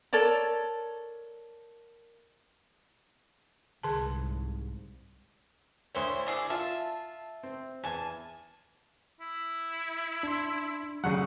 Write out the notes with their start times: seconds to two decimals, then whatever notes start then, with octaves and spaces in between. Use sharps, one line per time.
0.13 A4 A#4 C#5 D5
3.83 C2 G#2 D3 G#4 A5
5.95 D2 E4 C5 C#5
6.27 E4 G#4 D5
6.50 F4 E5 A5
7.43 C4
7.84 E2 G#5 A5
9.21 E4
10.23 D4 C6
11.04 D2 C#3 F#3 F#5